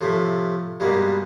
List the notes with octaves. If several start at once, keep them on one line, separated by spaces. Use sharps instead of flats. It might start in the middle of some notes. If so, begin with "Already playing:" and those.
A2 C3 F3 A3
G2 B2 G3 G#3 A#3